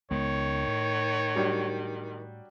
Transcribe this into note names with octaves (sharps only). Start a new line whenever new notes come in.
C#2 D#3 G#3 B3 C#5
A2
F#3 G3 D4